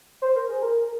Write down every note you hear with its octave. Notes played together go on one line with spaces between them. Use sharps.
C5
A#4
G#4
A#4